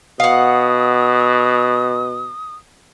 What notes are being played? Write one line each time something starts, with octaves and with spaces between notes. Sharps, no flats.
B2 F5 F#5 D#6